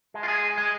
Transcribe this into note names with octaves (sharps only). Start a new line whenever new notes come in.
G#3
F4
G#4
G#3